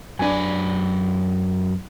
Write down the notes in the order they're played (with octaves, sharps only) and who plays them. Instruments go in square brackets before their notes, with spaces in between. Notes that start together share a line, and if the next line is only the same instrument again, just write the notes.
[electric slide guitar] F#2 B4 [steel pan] D4 G#5